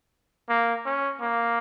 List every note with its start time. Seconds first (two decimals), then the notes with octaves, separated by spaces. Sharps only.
0.49 A#3
0.85 C#4
1.21 A#3